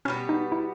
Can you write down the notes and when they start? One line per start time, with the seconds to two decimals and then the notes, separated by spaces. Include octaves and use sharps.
0.05 B2 G3 B3 C#4
0.29 D#4
0.52 E4